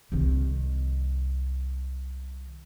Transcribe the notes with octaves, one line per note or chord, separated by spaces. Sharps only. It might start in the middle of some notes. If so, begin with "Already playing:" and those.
C2 D#3